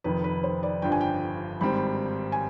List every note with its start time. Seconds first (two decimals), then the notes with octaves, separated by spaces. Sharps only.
0.04 F1 F2 D#3 B4
0.24 B4
0.43 C5
0.63 D5
0.82 G1 G2 F3 G5
0.92 G#5
1.01 G5
1.61 G#1 G#2 G3 C4 B5
2.32 G#5